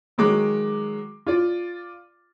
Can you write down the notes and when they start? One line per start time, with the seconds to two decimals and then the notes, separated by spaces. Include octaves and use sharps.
0.18 D#3 F#3 G#3 D6
1.26 F4 D5